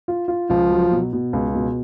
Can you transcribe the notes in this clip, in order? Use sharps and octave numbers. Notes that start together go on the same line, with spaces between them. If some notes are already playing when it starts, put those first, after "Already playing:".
F4
F4
C#2 F3
F#3
B2
B2
C#2
B2